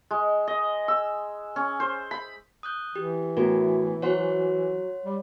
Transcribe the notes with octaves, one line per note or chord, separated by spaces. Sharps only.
G#3
D#5
E6
C#4
C5
B5
D#6 F#6 G6
E3 G4
A2 B3 F#4 A#4
F#3 F#4 C5 C#5 F#5 C6
G3